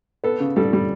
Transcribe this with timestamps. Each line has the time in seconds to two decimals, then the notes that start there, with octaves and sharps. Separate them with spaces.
0.24 B3 A4
0.40 C#3
0.56 G3 A4
0.73 G3